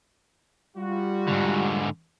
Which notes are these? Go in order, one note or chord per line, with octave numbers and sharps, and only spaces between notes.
G3 F4 F#4
G#2 D3